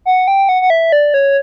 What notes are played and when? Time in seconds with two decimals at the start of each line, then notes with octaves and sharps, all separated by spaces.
0.06 F#5
0.28 G5
0.49 F#5
0.62 F#5
0.70 E5
0.92 D5
1.14 C#5